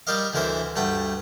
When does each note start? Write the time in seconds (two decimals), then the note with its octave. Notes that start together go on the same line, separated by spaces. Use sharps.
0.07 G3 G4 A#4 D#5 F5
0.33 D2 D3 E3 A#4 C5 E5
0.76 D2 G2 A3 F#5 G5